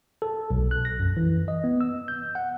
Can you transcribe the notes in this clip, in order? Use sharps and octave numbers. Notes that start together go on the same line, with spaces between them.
A4
B1
F#6
A#6
F#2
E3
D#5
B3
E6
G6
F#5